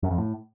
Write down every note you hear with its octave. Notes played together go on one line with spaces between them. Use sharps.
F#2
F2
A2